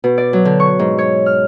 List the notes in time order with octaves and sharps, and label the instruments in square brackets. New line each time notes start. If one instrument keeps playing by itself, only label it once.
[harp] B2
D5
F#3
D3
C#6
G#2
C#5
F6